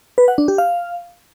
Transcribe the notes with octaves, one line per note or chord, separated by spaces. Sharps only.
B4
F#5
D4
G4
F5